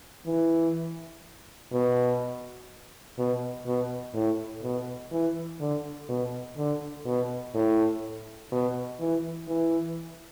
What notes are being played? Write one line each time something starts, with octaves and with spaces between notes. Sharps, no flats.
E3
B2
B2
B2
A2
B2
E3
D3
B2
D3
B2
A2
B2
E3
E3